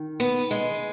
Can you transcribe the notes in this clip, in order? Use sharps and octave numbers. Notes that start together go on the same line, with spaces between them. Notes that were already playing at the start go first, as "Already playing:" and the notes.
Already playing: D#3
B3
G#3